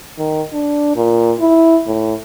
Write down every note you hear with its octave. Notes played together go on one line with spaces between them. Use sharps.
D#3
D4
A#2
E4
A2